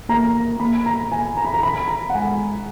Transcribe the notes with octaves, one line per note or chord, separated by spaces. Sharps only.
A#3 A#5
A#3 B5
A#5
G#5
A#5
B5
A#5
B5
A#5
F#5
G#3 G#5